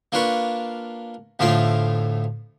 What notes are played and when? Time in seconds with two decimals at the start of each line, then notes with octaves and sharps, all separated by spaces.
0.12 A#3 D4 F4 B4 C#6
1.39 D2 A2 F3 F4 G5 C6